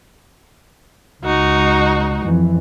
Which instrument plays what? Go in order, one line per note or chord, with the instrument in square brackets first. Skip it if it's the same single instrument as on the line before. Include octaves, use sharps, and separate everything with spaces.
[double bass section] C#2 G#3 [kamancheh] D#4 F#4
[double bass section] F2 E3